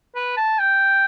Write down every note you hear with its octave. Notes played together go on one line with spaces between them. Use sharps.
B4
A5
G5